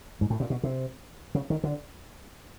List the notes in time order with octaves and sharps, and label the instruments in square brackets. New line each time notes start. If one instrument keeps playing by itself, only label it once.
[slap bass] G#2
A2
A#2
B2
C3
C#3
D#3
D3